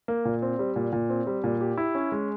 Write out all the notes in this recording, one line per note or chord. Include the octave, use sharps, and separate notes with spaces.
A#3
A#2
C4
G3
A#2
A#2
C4
G3
A#2
G4
E4
C#4
G#3